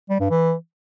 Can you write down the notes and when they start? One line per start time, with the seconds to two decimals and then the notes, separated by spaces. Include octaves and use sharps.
0.10 G3
0.20 G2
0.30 E3